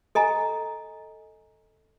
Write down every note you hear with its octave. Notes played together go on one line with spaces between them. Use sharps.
A4 D#5 G#5 A#5